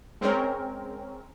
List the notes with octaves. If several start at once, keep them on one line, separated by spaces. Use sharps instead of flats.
G#3 C4 C#4 A#4